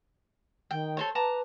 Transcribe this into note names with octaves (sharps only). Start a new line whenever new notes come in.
D#3 G5
A4 C5 C#5
B4 A5 A#5 D6